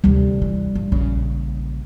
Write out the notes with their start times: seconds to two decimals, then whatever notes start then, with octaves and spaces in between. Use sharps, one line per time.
0.04 D2 C3 G3
0.42 E3
0.75 G2
0.92 A#1 C#3